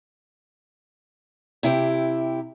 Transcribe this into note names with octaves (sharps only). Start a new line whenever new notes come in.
C3 E4 G4